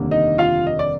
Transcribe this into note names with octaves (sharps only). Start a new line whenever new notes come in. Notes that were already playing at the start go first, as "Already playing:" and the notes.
Already playing: F1 D#2 D3 G3 A#3
D#4 D#5
F4 F5
D#5
D5